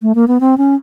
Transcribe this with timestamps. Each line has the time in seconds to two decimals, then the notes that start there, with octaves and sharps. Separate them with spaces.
0.02 A3
0.15 A#3
0.28 B3
0.41 C4
0.58 C#4